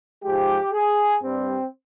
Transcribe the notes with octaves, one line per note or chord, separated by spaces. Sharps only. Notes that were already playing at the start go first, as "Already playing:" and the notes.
G#2 F3 G#3 G4
G#4
G2 G3 C4